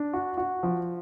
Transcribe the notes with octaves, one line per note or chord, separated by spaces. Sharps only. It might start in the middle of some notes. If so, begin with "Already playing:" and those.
Already playing: D4
F#4
F#4
F3